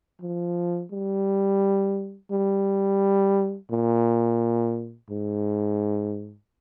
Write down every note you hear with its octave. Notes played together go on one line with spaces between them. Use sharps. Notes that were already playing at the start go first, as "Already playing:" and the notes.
F3
G3
G3
A#2
G#2